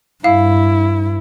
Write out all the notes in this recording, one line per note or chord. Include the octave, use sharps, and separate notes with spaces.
G2 E4 F5